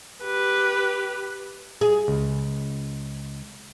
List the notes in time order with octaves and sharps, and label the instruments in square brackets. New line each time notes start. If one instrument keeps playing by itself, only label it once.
[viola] G4 B4
[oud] G#4
[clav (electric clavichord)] C#2